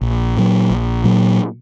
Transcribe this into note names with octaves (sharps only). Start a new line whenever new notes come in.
A#1
A#2 F#3
A#1
A#2 F#3